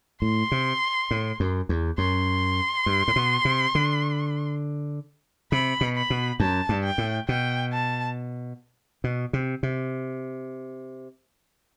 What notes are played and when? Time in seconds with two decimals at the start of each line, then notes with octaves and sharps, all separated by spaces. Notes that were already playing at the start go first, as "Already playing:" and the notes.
0.22 A2 C6
0.52 C3
1.11 A2
1.40 F#2
1.69 E2
1.98 F#2 C6
2.86 G2
3.08 A2
3.16 B2
3.45 C3
3.75 D3
5.52 C3 B5
5.81 B2
5.96 B5
6.10 B2
6.40 F#2 A5
6.69 G2
6.83 G5
6.98 A2
7.28 B2 G5
7.73 A5
9.04 B2
9.33 C3
9.63 C3